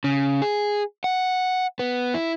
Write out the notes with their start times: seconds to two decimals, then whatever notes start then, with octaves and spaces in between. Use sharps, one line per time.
0.04 C#3
0.42 G#4
1.04 F#5
1.79 B3
2.14 E4